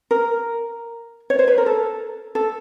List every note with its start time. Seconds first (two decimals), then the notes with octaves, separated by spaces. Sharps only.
0.11 A#4
1.30 C#5
1.39 C5
1.48 B4
1.58 A#4
1.66 A4
2.35 A4